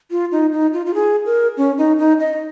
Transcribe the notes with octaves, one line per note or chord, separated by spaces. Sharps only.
F4
D#4
D#4
F4
F4
G#4
A#4
C#4
D#4
D#4
D#5